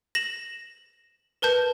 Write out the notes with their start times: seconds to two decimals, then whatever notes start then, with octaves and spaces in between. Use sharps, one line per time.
0.15 A#6 E7 F#7
1.42 A#4 B4 A5 G6